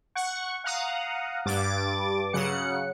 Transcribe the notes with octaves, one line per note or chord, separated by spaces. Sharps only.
F#5 C#6
F5 F#5 A#5 D#6
G2 D6 A6
C#3 F#3 F#5 C#7